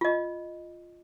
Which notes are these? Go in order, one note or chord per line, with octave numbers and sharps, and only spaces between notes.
F4 D#5